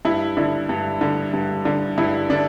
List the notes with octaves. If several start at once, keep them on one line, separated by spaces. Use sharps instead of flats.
G2 E4
D3 E4
G2
D3
G2
D3
G2 E4
D3 D4